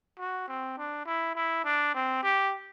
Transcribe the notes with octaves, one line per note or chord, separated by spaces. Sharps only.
F#4
C4
D4
E4
E4
D4
C4
G4